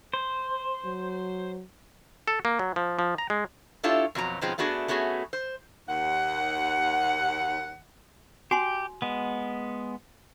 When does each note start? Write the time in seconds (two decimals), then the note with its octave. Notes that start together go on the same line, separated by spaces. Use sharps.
0.14 C5
0.85 F#3
2.28 A4
2.45 A#3
2.59 F#3
2.76 F3
2.99 F3
3.18 A#5
3.30 G#3
3.83 D4 E4 F4 G4 A4 C#5
4.15 F2 B2 F#3 A#5
4.42 G#2 B2 F3 G#3 C4 C#4
4.58 A3 B3 D4 F#4 G#4
4.88 A3 B3 C#4 F#4 G#4
5.33 C5
5.89 D#2 F#5
8.51 F#4 G4 G#5 C6
9.02 G#3 B3